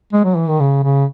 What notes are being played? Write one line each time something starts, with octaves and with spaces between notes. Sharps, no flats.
G#3
F#3
E3
D#3
C#3
C#3